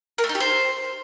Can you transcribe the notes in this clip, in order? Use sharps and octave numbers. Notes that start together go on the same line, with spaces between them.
A#4
A3
D#4
G4
C5